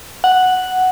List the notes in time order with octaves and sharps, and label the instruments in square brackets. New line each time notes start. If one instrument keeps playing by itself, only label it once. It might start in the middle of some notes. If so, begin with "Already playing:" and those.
[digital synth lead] F#5